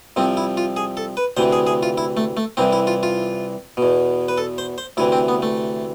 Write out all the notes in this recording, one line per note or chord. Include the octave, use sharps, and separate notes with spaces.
C2 C3 F3 C4
E4
F4
G#4
A4
B4
D2 C3 E3 C5
G#4
G#4
F4
E4
A3
A3
C2 C3 E3 C4
E4
F4
F4
B2
E2
B4
A4
C5
C5
D2 C3 E3 E4
C4
B3
A3